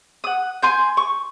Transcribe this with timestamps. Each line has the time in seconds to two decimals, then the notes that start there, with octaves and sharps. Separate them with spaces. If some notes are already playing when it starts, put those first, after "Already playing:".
0.24 F#5 D#6
0.62 G#5 C6 G6
0.97 C#6